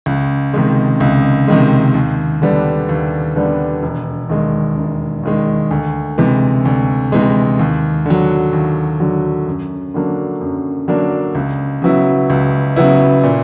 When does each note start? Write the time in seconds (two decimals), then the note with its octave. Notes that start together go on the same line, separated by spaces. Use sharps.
0.06 C#2
0.54 C3 D#3 G#3
1.00 C#2
1.48 C3 D#3 G#3
1.94 D#2
2.42 D3 G3 B3 D4
2.89 D#2
3.36 D3 G3 B3 D4
3.83 E1
4.29 D#2 D#3 G#3
4.77 E1
5.23 D#2 D#3 G#3
5.71 D2
6.18 C3 E3 G#3
6.65 D2
7.12 C3 E3 G#3
7.59 D#2
8.06 D3 F#3
8.53 D#2
9.00 D3 F#3
9.46 F#2
9.94 D3 F#3 A#3 D4
10.41 F#2
10.88 D3 F#3 A#3 D4
11.35 C#2
11.82 C#3 F#3 B3 E4
12.30 C#2
12.76 C#3 F#3 B3 E4
13.23 A#2